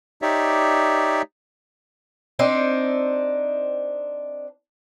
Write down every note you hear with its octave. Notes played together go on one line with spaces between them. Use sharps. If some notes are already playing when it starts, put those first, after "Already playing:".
D#4 G4 C#5 D5 E5
C4 D4 D#4